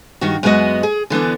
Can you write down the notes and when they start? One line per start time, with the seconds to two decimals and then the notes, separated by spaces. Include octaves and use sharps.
0.21 G2 D#3 F#4
0.43 F#2 G#3 B3 C4 F#4 D#5
0.83 G#4
1.10 D3 E3 B3 D4